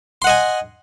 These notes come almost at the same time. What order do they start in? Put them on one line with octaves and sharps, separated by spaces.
C6 F#5 D#5 G#5